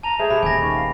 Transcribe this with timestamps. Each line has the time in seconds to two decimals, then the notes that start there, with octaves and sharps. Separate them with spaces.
0.03 A5 A#5 F7
0.19 G#3 A3 G#4 C5
0.30 C3 C4 B5
0.43 D#1 D#2 G#5 A#6
0.62 D#3 C#6
0.76 F5